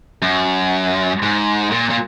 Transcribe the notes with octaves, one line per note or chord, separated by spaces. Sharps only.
F#2
G#2
A#2
A#2